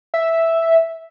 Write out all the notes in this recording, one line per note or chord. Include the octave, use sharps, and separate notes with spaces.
E5